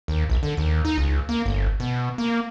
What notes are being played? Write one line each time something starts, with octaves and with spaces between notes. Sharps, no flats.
D#2
A#1
D3
D#2
D#4
C#2
A#3
G1
B2
A#3